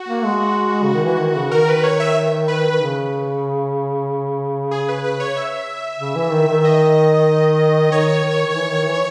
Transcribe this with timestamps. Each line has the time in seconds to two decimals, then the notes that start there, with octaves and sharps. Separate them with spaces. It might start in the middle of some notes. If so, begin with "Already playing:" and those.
Already playing: F#4
0.09 A#3
0.25 G#3
0.84 C#3
0.94 D#3
1.04 E3
1.19 D#3
1.36 C#3
1.51 D#3 A#4
1.69 B4
1.84 C#5
2.00 E5
2.48 B4
2.71 D#3
2.80 C#3
4.71 G#4
4.88 B4
5.04 B4
5.20 C#5
5.36 E5
6.00 C#3
6.15 E3
6.32 D#3
6.48 D#3
6.64 D#5
7.92 D#3 C#5
8.24 D#3
8.46 D#3
8.56 E3
8.71 D#3
8.87 E3